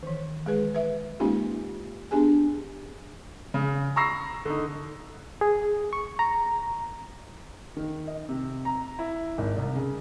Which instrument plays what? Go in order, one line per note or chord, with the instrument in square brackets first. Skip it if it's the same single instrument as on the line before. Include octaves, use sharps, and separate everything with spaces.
[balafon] D#3 E3
G#3 G#4 B4
B4 E5
G#3 A#3 C#4 D#4 F4 G4
B3 D4 G4 G#4 G#5
[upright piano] C#3
A#5 B5 C#6 E6 A#6 C7
D3 D#4
[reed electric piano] G#4
C#6
A#5
[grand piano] D#3
D#5
C3
A#5
E4
G#1
C2
C#3